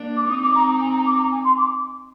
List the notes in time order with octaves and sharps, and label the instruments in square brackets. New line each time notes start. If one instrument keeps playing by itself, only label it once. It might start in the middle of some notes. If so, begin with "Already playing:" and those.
Already playing: [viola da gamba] A#3 D4
[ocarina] D6
[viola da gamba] C4 D#4 [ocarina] D#6
[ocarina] D6
A#5
A#5
G#5
A#5
D6
A#5
G#5
C6
D6